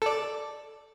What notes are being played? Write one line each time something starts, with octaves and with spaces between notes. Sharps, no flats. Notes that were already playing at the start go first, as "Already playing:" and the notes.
A4 D5